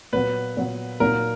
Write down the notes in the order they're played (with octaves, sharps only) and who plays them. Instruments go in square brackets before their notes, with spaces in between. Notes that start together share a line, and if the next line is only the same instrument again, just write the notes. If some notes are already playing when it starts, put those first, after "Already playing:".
[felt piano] A#2 F#3 B3 [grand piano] B4
[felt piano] A#2 F#3 B3
[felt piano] A#2 F#3 A#3 D#4 [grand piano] A#4